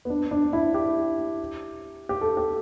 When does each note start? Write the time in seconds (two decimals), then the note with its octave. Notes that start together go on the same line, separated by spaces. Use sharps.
0.05 B3
0.10 D4
0.31 D4
0.53 E4
0.74 G4
2.09 G4
2.21 A4
2.37 G4